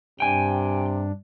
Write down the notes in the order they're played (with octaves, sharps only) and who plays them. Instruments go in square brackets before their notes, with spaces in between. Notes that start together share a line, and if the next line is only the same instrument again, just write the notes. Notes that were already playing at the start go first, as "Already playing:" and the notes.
[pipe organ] G2 D4 [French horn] C3 [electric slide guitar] G5 G#5